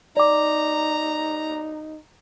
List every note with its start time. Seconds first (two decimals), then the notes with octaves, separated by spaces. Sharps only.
0.17 D#4 D5 A#5 D6